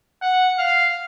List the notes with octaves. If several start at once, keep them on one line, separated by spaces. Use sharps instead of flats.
F#5
F5